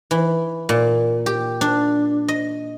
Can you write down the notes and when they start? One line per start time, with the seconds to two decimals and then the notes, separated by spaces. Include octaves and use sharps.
0.11 E3
0.69 A#2
1.26 G4
1.61 D4
2.28 D#5